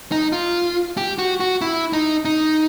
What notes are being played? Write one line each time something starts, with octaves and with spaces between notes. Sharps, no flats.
D#4
F4
G4
F#4
F#4
E4
D#4
D#4